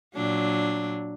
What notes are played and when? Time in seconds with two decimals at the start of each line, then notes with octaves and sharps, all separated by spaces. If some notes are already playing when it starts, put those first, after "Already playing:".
0.15 A#2 F#3 D4